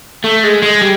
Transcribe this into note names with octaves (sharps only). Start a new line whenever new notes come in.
A3
G#3
G#3
G3